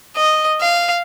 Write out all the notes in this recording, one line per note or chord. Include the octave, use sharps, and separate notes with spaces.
D#5
F5